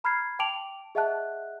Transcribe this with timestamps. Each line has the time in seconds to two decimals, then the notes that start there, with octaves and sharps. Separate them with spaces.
0.04 A#5 B5 F6 G6 G#6 C7
0.39 G5 A5 D6 D7 F7 F#7
0.95 G#4 D#5 E5 F#5 A5 F#6